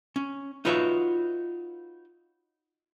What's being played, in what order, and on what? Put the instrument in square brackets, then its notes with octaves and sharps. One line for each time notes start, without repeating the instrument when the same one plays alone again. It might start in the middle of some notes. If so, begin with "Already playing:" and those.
[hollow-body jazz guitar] C#4
D#4 F4 F#4 B4 C#5 E5